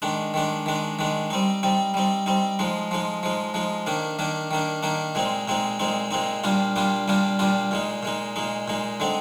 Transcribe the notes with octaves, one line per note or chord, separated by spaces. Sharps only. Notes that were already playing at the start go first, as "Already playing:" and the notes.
D#3 G#3 D4
D#3 G#3 D4
D#3 G#3 D4
D#3 G#3 D4
G3 C4 D#4
G3 C4 D#4
G3 C4 D#4
G3 C4 D#4
F3 G#3 D#4
F3 G#3 D#4
F3 G#3 D#4
F3 G#3 D#4
D#3 A#3 D4
D#3 A#3 D4
D#3 A#3 D4
D#3 A#3 D4
A#2 G#3 C4 D#4
A#2 G#3 C4 D#4
A#2 G#3 C4 D#4
A#2 G#3 C4 D#4
A#2 G3 D4 F4
A#2 G3 D4 F4
A#2 G3 D4 F4
A#2 G3 D4 F4
A#2 G#3 D#4
A#2 G#3 D#4
A#2 G#3 D#4
A#2 G#3 D#4
D3 G#3 C4 D#4